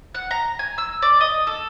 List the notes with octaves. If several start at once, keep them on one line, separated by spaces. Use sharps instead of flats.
F#5
A#5
G#5
E6
D5
D#5
A4